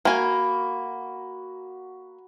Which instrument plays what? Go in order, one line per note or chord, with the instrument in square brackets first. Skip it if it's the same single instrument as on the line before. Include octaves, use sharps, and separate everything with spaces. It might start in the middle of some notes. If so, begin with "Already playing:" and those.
[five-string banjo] A#3 G#5 [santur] F#4 A#5 B5